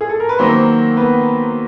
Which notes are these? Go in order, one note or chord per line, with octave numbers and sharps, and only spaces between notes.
G#4
A4
A#4
B4
D#3 F#3 A#3 C4 C5
B3 B4